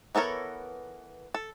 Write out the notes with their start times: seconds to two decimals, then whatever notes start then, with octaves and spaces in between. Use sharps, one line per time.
0.15 E3 B3 A4 A#4 C#5
1.34 A4